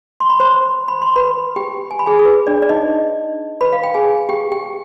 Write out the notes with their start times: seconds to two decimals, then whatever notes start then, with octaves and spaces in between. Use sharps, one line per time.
0.20 C6
0.30 B5
0.40 C5 C6
0.88 B5
1.02 C6
1.16 B4 B5
1.56 G4 G5
1.91 G#5
1.99 B5
2.06 G#4 G#5
2.19 G#4
2.25 B4
2.47 D4 D5
2.62 D5
2.69 D#4 D#5
3.61 B4 B5
3.73 F5
3.83 G5
3.94 G#4 G#5
4.29 G4 G5
4.52 G4 G5